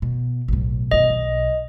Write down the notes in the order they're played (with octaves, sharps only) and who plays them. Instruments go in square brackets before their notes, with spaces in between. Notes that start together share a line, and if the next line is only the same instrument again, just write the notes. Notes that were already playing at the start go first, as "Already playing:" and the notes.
[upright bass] B2
B1 A2
[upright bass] G2 B2 [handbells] D#5
[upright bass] B1